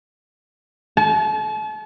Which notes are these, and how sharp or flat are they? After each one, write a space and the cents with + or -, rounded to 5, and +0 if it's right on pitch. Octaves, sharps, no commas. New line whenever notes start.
A5 -40